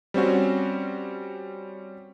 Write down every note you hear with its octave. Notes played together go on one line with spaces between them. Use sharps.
G3 C4 C#4 F#4